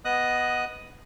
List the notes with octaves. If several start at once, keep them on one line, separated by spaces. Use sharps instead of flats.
B3 D#5 D#6 F#6